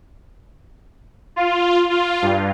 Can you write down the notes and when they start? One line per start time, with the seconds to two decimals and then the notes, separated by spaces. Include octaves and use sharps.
1.36 F4
1.90 F4
2.22 G2